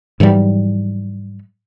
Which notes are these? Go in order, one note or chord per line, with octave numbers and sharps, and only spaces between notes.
G#2 E3 F#3 G3